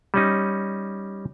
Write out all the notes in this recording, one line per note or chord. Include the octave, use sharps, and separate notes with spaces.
G3 C#4 D#4